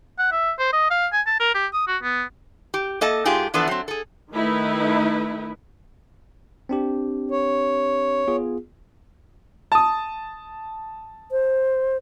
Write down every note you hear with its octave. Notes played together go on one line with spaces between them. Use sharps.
F#5
E5
C5
D#5
F5
G#5
A5
A#4
G4
D#6
F#4
B3
G4
A#3 A4 D#5 A5
G#2 F4 G4 G#4
E3 F3 B3 D4 A4 F#5
F#3 C4
G#4 A4
D#3 A3 D#4 E4 B4
C4 D4 G4
C#5
B3 F4 G#4
A5 D#6
C5